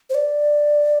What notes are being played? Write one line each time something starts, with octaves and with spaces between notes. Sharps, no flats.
C5
D5